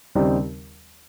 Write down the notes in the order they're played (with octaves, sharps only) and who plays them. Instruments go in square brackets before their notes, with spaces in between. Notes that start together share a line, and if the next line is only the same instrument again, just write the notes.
[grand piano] D#2 C#3 G3 C4 D#4